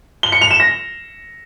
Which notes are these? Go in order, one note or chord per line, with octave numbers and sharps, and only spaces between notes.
G7
C#7
F7
E7
A#6